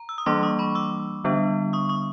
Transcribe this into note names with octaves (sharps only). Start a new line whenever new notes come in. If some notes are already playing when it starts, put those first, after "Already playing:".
Already playing: A#5
E6
D#6
E3 G3 A#3 D4 C6 D6
C#6 D#6
B5 C#6
D6 E6
D3 G3 B3 D4
C#6 D#6
C#6 D#6